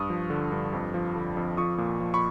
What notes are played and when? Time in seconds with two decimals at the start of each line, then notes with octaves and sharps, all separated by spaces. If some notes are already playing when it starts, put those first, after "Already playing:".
Already playing: G2 C#6 D#6
0.10 F3
0.30 D3
0.52 G2
0.73 F2
0.94 F3
1.16 D3
1.37 F2
1.57 F3 C#6 D#6
1.78 A#2
2.00 F3
2.14 B5 C#6